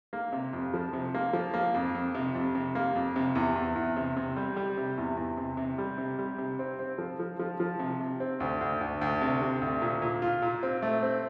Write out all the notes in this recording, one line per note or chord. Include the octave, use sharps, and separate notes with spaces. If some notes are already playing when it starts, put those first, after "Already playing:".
A#3
C3
F2
F3
C3
A#3
F3
A#3
F2
F2
C3
F2
C3
A#3
F2
C3
E2
E2
E2
C3
C3
G3
G3
C3
E2
E2
C3
C3
G3
C3
G3
C3
C4
C4
F3
F3
F3
F3
C3
C3
C4
D2
D2
D2
D2
C3
C3
D2
A#2
A#2
F4
A#2
C4
A3
C4